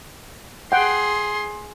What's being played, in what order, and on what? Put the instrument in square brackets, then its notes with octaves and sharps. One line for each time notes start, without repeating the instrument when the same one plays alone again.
[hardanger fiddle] G#4 C6 [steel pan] F#5 G5